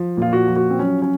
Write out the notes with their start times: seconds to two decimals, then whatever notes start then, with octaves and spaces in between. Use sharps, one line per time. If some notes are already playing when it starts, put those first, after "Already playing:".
Already playing: F3
0.17 A#2 F4
0.33 F#4
0.48 F3
0.56 F#4
0.70 C4
0.79 F#3 C#4
1.02 C#4